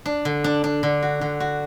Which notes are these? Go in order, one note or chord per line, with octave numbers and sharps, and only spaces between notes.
D4
D3
D4
D4
D3
F#4
D3
F#4